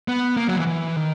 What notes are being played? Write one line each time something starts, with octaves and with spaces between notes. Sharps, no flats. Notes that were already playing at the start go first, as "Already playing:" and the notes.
B3
A#3
F#3
E3
E3
D#3